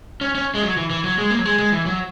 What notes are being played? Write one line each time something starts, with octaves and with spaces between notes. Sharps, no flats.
C#4
C#4
G#3
F#3
E3
E3
F#3
G#3
A#3
F#3
G#3
G#3
E3
F#3